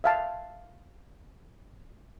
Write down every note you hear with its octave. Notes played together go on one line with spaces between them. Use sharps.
E5 F5 A5